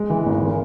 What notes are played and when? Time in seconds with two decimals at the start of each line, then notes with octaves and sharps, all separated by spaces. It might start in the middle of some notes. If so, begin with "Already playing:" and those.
Already playing: G#3
0.10 E3
0.26 G#1
0.46 A#3